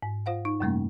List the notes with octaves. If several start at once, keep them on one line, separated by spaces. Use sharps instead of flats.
G#2
F4 C5 F5 F#5
D#4
F#2 C3 G3 A3 A#3 C#4